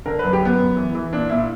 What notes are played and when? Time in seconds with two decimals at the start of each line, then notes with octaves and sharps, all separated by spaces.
0.05 D3 A#4
0.19 F#2 B4
0.33 G4
0.42 F#2 B3
0.59 F#2
0.76 E3
0.95 E3
1.12 A#2 D4
1.29 A#2 E4